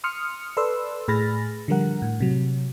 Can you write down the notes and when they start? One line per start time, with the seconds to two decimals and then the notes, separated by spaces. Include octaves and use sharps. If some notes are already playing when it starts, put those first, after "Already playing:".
0.04 C6 D#6 F6 C#7
0.57 A4 B4 D5 C6 E6
1.08 A2 G#4 B5 F6 A6 A#6
1.68 D3 F3 G3 A#4 F#5
2.02 A2
2.20 C3 F#3